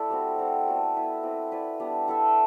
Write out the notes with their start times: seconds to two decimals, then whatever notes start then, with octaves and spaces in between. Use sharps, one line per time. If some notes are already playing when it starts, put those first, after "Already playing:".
Already playing: A3 E4 A4 D5
0.10 G3 C4 F#4
0.38 G3 C4 F#4 C5
0.66 B3 F#4 A4 D5
0.94 B3 E4 B4
1.23 C4 E4 B4 D5
1.51 E4 B4 D5
1.80 G3 B3 D4
2.08 E4 A4 E5